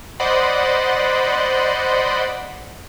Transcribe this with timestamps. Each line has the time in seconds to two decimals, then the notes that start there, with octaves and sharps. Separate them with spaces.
0.20 C5 D5 D#5 F#5 B5 C6